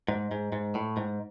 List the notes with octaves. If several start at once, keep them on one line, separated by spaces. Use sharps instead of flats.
G#2
G#2
G#2
A2
G#2